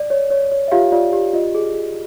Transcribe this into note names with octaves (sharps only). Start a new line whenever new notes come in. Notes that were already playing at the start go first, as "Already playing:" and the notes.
Already playing: D5
C#5
C#5
C#5
E5
F4 G4 F5
F4 D5 F5
G4
F4 D#5
G#4
G#4